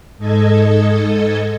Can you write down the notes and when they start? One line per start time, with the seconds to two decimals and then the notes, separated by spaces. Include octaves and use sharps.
0.18 G#2 A4 D#5 G#6